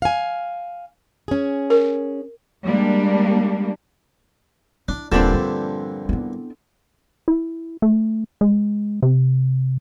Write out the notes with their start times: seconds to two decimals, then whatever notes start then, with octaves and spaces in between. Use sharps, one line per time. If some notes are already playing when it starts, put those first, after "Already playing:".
0.02 F5 G#5
1.28 C#4 G#4
1.70 A#4
2.65 G3 G#3 A#3 D4
4.88 D4 E4
5.12 D#1 G2 A#2 D3 C4 D4 A4
5.34 F3
6.09 B3 E4
7.28 E4
7.82 A3
8.41 G#3
9.03 C3